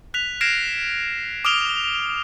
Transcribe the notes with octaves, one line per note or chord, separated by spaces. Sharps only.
F#6 B6 F7
F6 G#6 A#6 C7 D7 E7
D6 D#6 F6 D7 F7 G7